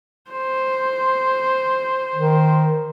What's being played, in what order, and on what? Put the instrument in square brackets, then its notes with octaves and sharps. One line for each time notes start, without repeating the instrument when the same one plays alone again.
[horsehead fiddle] C5
[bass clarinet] D#3